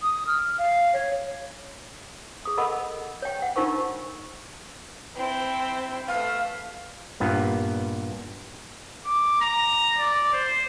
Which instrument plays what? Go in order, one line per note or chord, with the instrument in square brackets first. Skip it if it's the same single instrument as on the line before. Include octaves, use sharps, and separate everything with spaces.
[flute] D#6
F6
F5
C#5
[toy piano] G#4 D#6
A4 A#4 D#5 F#5 B5
C#5 G5
F#5
D4 D#4 F4 A#4 C5 C#6
[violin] C4 E4
[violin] A3 B3 [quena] F5
[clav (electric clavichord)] G2 A#2 B3
[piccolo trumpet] D6
A#5
D5
C5